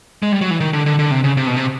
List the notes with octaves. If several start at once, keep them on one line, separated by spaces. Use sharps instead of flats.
G#3
G3
F#3
E3
D#3
D3
D3
D3
C3
C#3
C3
B2
C3